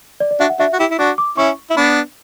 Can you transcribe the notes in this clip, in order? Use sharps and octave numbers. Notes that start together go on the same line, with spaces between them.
D5
D5
D4 F#4 E5
F#5
D4 F#4 E5
F#4
E4 G4
E4
D4 F#4 D6
D6
C#4 E4 C#6
E4
B3 D4 B5